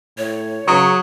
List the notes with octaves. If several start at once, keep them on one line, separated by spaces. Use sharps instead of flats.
A2 C#5
C#3 F#3 A#5 C#6 D#6